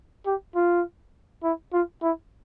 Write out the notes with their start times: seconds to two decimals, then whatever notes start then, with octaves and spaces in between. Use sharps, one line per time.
0.26 G4
0.55 F4
1.43 E4
1.73 F4
2.02 E4